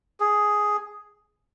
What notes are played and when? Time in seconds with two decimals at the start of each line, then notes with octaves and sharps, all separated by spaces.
0.20 G#4